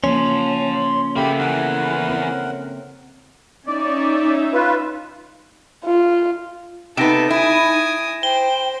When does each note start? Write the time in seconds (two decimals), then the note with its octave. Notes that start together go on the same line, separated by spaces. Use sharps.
0.04 C#3 F3 A#3 C#4 A5 C6
1.16 C#3 A#3 B3 G4 A4 E5 B5
1.39 E2 E3 A#4 F#5
2.09 C4
3.67 C#4 D#4 D5 E5
4.53 F4 B4
5.85 F4
6.97 C3 B3 D#4 A4 A#6 D7 E7
7.31 E4 G#5 D#6
8.23 C5 G5 G7